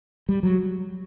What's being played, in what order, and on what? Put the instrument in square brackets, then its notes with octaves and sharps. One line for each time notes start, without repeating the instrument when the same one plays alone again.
[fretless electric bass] G3
F#3